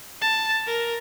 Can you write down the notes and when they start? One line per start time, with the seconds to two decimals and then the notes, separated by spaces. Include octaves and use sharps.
0.22 A5
0.67 A#4